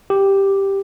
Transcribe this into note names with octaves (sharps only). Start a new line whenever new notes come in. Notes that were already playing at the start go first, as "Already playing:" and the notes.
G4